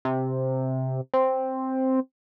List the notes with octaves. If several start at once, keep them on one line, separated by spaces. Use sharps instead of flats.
C3
C4